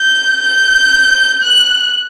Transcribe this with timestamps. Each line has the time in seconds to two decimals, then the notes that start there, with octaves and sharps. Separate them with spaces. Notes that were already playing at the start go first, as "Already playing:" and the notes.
Already playing: G6
0.41 G6
1.42 F#6